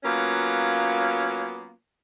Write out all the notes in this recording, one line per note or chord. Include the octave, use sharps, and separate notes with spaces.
F#3 A#3 B3 C#4 F4